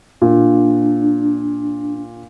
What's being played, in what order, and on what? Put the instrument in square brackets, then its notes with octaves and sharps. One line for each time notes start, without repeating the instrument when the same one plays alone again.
[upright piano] A#2 [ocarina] D4